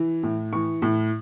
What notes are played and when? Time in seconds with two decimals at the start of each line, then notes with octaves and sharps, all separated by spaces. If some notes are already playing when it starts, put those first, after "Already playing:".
Already playing: E3
0.23 A2
0.53 E3 C#6
0.82 A2